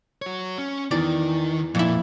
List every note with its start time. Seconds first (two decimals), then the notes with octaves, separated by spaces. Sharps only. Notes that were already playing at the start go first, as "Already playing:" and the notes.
0.22 F#4 C#5
0.58 C#4
0.91 E2 D#3 E3 D5
1.75 F2 A#2 E4